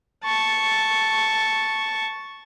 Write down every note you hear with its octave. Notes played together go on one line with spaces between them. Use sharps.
A5 C#6